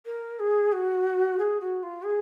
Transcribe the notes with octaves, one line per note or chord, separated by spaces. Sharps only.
A#4
G#4
F#4
G#4
F#4
F4
G#4